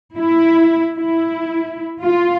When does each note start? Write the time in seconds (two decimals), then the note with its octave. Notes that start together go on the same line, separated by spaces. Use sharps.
0.18 E4
0.97 E4
2.02 F4